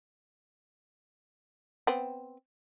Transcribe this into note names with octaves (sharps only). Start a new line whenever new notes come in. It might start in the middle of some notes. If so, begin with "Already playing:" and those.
B3 C4